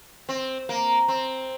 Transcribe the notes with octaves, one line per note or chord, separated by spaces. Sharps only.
C4
A#3
C4